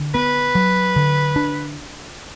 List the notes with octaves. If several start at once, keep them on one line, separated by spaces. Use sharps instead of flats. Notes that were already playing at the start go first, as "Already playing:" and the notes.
Already playing: D3
B3 B4
F#3
D3
D4